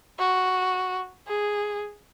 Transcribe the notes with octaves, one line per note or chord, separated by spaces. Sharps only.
F#4
G#4